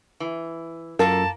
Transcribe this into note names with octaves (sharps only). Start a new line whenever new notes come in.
E3
F#2 A#3 F4 A4 A#4 A5